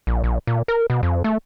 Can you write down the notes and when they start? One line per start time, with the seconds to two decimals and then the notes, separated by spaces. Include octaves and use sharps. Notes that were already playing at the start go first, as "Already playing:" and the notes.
0.07 A#1
0.24 A#1
0.47 A#2
0.68 A#4
0.90 B2
1.03 F2
1.24 A3